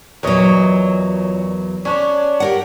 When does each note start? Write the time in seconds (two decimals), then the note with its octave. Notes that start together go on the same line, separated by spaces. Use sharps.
0.23 E2 A#2 F#3 C#5 D#5
1.85 C#4 D4 C#5
2.40 G4 A#4 F#5